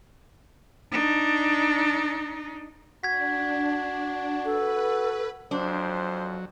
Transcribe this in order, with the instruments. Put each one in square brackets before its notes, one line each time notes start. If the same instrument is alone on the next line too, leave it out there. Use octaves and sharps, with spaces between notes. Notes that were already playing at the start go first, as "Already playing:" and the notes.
[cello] D4 D#4
[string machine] D4 [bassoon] F#4 [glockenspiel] G#6 B6
[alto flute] A4 [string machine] B4
[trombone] F2 [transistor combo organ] F#3 [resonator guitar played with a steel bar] D4 [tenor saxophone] C5